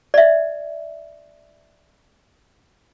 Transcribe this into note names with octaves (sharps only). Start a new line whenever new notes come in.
D5 E5